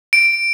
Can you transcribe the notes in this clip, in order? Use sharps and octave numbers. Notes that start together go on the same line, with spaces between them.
D7